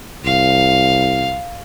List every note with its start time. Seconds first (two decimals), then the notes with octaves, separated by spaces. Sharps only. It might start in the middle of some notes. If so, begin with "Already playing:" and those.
0.24 C2 F5